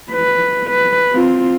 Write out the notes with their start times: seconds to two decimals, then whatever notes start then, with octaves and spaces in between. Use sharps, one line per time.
0.12 B4
0.70 B4
1.13 C4 F4